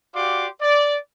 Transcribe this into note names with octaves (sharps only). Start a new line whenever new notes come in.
F#4 G4 D5 F5 C6 D6
D5